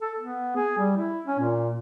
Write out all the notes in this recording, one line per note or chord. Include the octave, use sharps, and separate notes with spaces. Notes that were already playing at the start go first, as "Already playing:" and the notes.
A4
B3
G#4
G3
E4
C#4
A#2